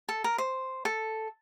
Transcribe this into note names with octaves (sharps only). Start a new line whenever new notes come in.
A4
A#4
C5
A4